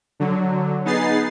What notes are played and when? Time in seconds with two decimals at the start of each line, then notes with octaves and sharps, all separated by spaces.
0.20 D3 F#3
0.85 B3 D#4 G#4 A6 C7